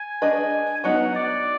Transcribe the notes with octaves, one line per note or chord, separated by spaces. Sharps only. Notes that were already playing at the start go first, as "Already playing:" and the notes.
Already playing: G#5
D4 G#4 B4 D#5
F#3 B3 D#4 F#5
D5